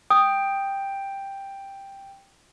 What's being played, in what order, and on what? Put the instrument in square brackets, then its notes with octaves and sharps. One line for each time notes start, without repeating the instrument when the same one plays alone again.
[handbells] G5 [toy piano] D#6